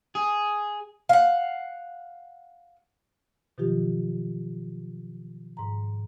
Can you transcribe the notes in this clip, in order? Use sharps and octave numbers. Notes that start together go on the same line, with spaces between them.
G#4
F5 F#5
B2 D#3 F3 F#3 F4 G4
G#2 A#5